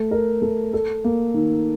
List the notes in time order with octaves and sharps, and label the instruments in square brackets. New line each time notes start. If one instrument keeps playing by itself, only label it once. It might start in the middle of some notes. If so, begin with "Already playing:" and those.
Already playing: [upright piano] A3
A#4
A3
A4
A#3
D#3